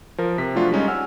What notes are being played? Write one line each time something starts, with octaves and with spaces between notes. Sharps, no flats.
F3 A#4
C3 B6
F3 F#3 A3 D4 F4 F#4
G3 G#3 C#4 D#4
F#5 G#5 E6 F6